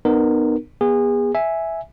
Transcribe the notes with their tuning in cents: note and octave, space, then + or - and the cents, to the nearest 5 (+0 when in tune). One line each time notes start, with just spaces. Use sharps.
B3 +0 D#4 -40 A#4 +0
B3 -30 G#4 -30
E5 -5 G#5 +0